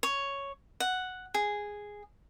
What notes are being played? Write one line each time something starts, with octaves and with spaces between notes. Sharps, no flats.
C#5
F#5
G#4